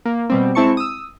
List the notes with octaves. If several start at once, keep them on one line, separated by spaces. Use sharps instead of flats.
A#3
B2 G3 C4
G#3 C4 E4 A5 C#6 C#7
D#6 E6